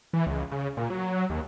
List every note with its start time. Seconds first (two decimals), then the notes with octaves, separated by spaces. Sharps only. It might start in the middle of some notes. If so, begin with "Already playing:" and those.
0.13 E3
0.26 C#2
0.52 C#3
0.77 A#2
0.90 F#3
1.30 D#2